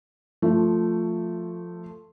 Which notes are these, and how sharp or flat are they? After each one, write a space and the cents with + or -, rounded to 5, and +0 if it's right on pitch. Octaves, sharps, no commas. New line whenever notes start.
F3 +5 A3 +10